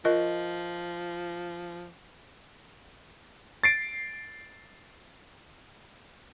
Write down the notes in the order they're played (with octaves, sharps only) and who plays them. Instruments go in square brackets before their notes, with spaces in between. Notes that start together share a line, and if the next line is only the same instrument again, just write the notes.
[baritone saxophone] F3 [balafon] F4 A#4 [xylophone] D#5
[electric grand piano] A6 C7 D7